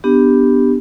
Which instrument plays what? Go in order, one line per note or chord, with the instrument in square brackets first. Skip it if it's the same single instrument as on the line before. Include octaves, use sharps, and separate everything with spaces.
[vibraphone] B3 D4 G4